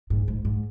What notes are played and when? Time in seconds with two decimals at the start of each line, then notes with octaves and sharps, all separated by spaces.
0.10 G#2
0.28 G#2
0.45 G#2